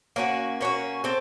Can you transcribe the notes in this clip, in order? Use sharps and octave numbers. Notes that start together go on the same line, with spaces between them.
A#3 C#4 F#4
A#3 C#4 F#4
C4 A4